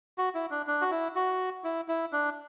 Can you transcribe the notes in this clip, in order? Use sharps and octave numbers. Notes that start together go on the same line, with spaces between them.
F#4
E4
D4
D4
F#4
E4
F#4
E4
E4
D4